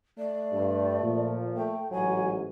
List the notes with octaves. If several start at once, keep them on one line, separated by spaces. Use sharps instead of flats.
A3 D5
G2
A#2 F3
A3 G5
A1 G#2 F#3 G#5